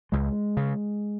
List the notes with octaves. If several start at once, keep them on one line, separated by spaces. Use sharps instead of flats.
C#2 G#3
C#3